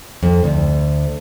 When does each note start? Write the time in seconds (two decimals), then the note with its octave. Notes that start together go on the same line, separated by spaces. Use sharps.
0.23 F2
0.44 D2